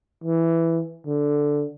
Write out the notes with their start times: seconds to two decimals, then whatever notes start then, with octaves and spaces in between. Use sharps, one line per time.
0.24 E3
1.07 D3